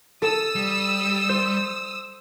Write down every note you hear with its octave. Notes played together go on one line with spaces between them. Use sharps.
A4 D#6 E6
G3
C5